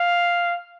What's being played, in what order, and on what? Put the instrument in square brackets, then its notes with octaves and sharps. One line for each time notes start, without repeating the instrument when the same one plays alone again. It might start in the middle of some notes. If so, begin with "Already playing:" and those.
Already playing: [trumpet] F5